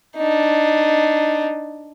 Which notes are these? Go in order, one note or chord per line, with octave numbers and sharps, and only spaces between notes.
D4 D#4